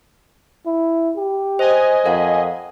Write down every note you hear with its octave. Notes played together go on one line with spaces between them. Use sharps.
E4
G4
C5 D#5 G#5
F2 A#4 F5 F#5